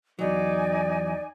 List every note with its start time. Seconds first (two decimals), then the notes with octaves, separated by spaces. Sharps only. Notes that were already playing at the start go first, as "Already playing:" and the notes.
0.19 E2 F#3 D#4 D5 G#5